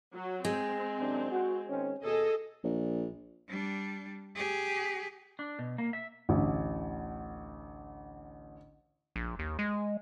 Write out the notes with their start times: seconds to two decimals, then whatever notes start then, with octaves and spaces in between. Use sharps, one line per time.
0.12 F#3
0.45 G#3 C4
1.00 F#2 C3 D4
1.31 F#4
1.69 D#3 C4 C#4
2.04 D#2 B2 G#4 A4 D#5
2.64 A#1
3.49 G3 D4
4.35 G4 G#4
5.39 D4
5.59 B2
5.78 A#3
5.93 E5
6.29 A1 D2
9.16 A#1
9.39 D#2
9.59 G#3